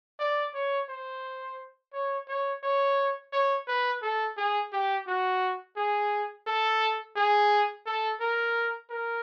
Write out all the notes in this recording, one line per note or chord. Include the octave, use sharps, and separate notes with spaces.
D5
C#5
C5
C#5
C#5
C#5
C#5
B4
A4
G#4
G4
F#4
G#4
A4
G#4
A4
A#4
A#4